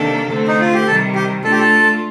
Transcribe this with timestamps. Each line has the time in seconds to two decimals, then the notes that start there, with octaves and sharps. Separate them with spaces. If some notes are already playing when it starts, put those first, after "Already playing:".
Already playing: C3 D#3 A#3 D4 A4
0.30 D3 A3 C4
0.48 D#4
0.61 F4
0.74 G4
0.87 C3 D#3 G3 A4
1.15 G4
1.44 A3 D4 F4 A4
1.52 G4
1.59 A4